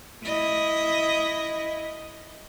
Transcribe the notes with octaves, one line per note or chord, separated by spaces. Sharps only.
E4 D#5